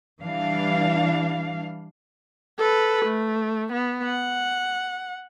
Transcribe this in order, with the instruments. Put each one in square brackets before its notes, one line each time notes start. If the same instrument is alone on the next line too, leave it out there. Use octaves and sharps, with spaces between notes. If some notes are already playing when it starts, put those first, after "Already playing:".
[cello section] E3 G3 D4 F5
[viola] A4 B4
A3
B3
F#5